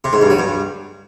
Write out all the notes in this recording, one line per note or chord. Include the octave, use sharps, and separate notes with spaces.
C3
G#2
G2
F#3
G2